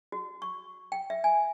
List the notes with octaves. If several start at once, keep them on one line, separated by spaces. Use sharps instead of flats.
F#4
C#6
G5
E5
G#5